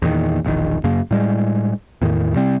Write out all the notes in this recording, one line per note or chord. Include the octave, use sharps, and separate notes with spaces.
E2 A#2 D#3
E1 A#1 D#3
F#2 C#3 A#3
A2 G3 G#3
E2 A2 D#3
C3 G3 C4